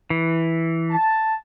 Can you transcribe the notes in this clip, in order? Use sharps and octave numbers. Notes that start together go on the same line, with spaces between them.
E3
A5